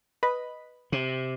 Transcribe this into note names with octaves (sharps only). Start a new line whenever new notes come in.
B4 D#5 B5
C3